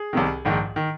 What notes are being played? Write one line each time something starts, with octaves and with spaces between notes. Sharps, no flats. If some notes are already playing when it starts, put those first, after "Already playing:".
Already playing: G#4
C2 C3 D#3
A#1 G#2 D#3
D#3